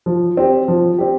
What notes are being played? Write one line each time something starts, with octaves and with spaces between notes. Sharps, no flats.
F3
C4 G4
F3
C4 G4